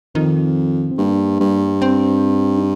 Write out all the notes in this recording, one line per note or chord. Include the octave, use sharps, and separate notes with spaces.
F2 D#3
C4
G2 A#3
G2
C4
D#4